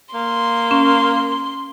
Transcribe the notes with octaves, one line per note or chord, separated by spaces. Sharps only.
A#3 C6
C#4